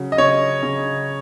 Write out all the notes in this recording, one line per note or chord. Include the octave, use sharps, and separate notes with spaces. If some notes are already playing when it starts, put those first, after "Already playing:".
Already playing: C#3 F#3
D#5
C#3 C#5
C#3